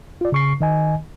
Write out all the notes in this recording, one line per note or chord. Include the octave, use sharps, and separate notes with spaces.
F4 D5
C#3 C#6 C7
D#3 D#5 G#5